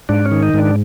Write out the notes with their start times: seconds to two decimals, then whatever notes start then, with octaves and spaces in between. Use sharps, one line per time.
0.09 G#2 D4
0.25 C#4
0.32 D#3
0.43 D#4
0.54 G#2 D4